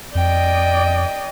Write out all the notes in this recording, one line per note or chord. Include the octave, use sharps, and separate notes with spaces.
F2 D5 D#5 G5